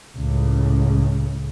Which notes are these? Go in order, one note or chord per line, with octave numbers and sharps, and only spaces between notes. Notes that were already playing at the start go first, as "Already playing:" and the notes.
C#2 A2 C#3